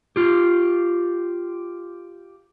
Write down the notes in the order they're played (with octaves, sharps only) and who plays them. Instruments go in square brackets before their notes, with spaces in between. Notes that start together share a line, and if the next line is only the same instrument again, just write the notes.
[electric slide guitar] F4 G4